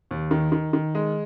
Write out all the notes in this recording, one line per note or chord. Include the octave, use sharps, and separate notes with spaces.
D#2
D#3
D#3
D#3
G#3